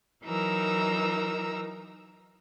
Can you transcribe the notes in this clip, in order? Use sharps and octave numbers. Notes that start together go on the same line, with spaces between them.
E3 F#3 D#4 A#4 A#5 E6